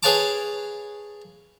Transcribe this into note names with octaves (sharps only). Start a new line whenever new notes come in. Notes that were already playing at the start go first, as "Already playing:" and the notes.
G#4 B4 C#5 F5 A5 D6